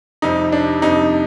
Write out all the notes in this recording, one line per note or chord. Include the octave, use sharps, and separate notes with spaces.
F2 C3 G3 D#4
D4
F2 C3 G3 D#4